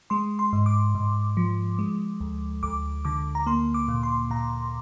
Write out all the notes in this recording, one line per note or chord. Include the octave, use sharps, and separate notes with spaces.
G#3 C6
C6
G#2
D6
G#2
F3
G#3
D2
D2 D6
D3 D6
A#5
A#3 C6
D6
A#2
C6
A#2 A#5